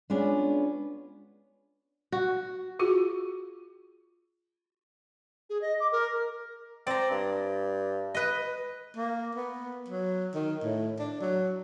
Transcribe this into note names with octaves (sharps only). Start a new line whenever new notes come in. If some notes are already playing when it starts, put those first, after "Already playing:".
G#3 B3 C#4 D4 F4
F#4
F4 F#4 G#4
G#4
D#5
D6
A#4
C4 D5 A#5
G2
B4 D#5
A#3
B3
F#3
D#3
A2
D4
F#3